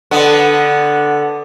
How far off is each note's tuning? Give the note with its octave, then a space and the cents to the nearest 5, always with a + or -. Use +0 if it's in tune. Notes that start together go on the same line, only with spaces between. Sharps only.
D3 +0 B3 +0